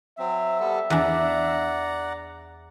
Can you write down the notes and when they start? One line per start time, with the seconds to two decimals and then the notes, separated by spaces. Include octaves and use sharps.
0.19 F#3 C4 E5
0.60 G3 B3 A4
0.90 E2 D4 D5 F#5 A#5